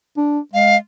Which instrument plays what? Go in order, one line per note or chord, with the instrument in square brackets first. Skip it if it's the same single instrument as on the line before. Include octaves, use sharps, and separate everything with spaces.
[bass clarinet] D4
[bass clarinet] G#3 [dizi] F5